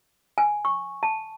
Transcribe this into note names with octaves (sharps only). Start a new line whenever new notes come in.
G#5
C#6
A5